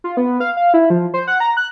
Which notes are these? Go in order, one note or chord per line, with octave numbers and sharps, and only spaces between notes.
F4
B3
F5
F5
E4
F3
C5
F#5
A#5
F#6